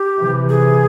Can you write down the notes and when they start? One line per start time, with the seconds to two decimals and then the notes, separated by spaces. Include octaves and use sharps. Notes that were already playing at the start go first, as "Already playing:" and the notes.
Already playing: G4
0.19 C3 E3
0.49 G#4